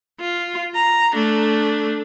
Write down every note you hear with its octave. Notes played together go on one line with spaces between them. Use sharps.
F4
A#5
A3 D4